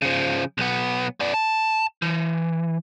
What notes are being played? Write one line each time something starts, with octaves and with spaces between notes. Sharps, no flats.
C#3 F3
B1 B3
B3 D5
A5
E3